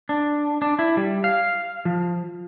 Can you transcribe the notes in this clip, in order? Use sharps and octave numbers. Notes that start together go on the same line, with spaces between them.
D4
D4
E4
G3
F5
F3